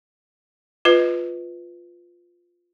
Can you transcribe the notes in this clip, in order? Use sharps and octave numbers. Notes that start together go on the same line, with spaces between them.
F4 B4 D#5